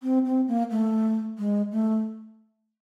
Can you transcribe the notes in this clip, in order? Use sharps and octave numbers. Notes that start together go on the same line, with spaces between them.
C4
C4
A#3
A3
G#3
A3